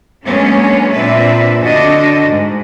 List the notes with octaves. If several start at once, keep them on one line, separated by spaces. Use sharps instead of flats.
F#3 G#3 A#3 B3 C#4 D4
A#2 C4 D4 B4 E5
D3 D4 F#4 D#5
G#2